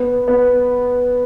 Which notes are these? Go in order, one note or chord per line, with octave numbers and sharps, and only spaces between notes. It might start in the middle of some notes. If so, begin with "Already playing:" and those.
Already playing: B3
B3